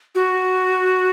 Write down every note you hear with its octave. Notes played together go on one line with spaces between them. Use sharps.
F#4